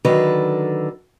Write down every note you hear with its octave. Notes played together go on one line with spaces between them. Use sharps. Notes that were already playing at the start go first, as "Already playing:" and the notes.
D3 D#3 F#3 A4 B4